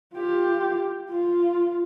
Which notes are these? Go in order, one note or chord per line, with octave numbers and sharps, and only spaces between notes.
F4 G4
F4